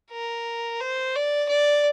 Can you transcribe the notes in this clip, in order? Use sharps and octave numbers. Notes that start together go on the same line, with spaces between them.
A#4
C5
D5
D5